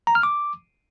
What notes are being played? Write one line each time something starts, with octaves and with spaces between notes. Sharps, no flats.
A#5
F6
D6